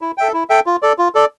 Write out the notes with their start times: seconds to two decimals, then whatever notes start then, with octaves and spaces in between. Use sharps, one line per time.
0.02 E4
0.18 A4 E5 G5
0.34 E4
0.50 A4 E5 G5
0.66 F4
0.82 A4 D5
0.98 F4
1.15 A4 D5